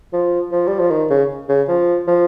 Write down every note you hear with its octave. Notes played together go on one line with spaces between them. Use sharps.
F3
F3
G3
F3
D#3
C#3
C#3
F3
F3